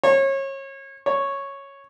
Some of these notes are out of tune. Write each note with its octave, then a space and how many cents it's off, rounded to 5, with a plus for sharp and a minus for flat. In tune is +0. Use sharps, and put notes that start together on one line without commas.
C#5 -30
C#5 -5